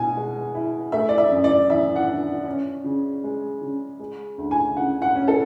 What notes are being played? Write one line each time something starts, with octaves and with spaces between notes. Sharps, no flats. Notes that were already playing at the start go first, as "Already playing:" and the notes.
Already playing: B2 G#5
G#3
E4
A3 E5
D5
E5
F#2
D5
E3 E5
F#5
D4
C#4
C#3
G#3
C#3
G#3
D2
G#5
C#3 F#5
F#5
C#4
A4